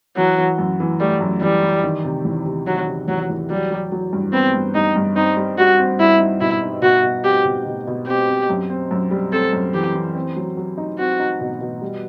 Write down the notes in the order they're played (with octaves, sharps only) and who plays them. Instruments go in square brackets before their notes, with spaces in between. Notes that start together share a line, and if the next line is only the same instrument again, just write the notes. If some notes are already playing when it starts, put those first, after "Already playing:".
[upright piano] E3 [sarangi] F#3
[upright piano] E3
F#2
E3
[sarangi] G3 [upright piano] A3
[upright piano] F#2
[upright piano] E3 [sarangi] G3
[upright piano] E3
D#3
C3
E2
C3
[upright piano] D#3 [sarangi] F#3
[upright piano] C3
[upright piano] E2 [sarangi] F#3
[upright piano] E2
[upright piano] F#3 [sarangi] G3
[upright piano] F#3
F#3
G2
[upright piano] B3 [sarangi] C4
[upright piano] G2
[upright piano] G2 [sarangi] D#4
[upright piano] G2
[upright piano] C4 [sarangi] D#4
[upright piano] G3
[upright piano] G3 [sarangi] F#4
[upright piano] C4
[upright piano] G3 [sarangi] E4
[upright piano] D#4
[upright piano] B2 [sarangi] E4
[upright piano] D#4
[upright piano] B2 [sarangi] F#4
[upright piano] B2
[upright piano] C4 [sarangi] G4
[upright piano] B2
B2
B2
[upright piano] C4 [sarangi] G4
[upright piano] C4
F#2
C4
F#2
G3
[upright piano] C4 [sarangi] A4
[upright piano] F#2
[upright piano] E3 [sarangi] G4
[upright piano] E3
C4
F#3
F#3
D#4
[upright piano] C4 [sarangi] F#4
[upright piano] D#4
B2
B2
G3